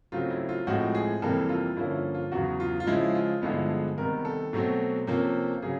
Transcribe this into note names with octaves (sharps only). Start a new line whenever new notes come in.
C#3 F#3 A3 C4 F4
E4
F4
A2 F3 G#3 C4 F#4
G#4
F2 C3 E3 G3 A#3 A4
F4
G2 D3 F3 A#3 C#4 E4
F4
F4
E2 C#3 F#3 F#4
F4
F4
C#3 F3 G#3 E4
F4
G2 D3 F3 G#3 B3 E4
G#4
C3 D#3 G3 B3 A#4
A4
B2 F#3 A3 C4
C3 F3 A#3 C#4
C#3 F#3 G#4